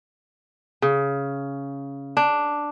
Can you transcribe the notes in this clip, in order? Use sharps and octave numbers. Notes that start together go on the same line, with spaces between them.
C#3
D4